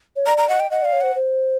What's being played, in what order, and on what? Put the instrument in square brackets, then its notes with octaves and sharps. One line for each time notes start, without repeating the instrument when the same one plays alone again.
[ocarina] C#5
[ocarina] D5 [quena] A#5
[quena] A#5
[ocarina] D#5 [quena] F#5
[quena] G5
[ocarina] D#5 [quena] F#5
[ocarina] D5 [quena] F5
[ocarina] C#5
[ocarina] C5 [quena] F#5
[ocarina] C5